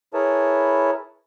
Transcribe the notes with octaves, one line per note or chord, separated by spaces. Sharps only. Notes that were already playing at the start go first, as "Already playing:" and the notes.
E4 G#4 A#4 B4 C#5 A5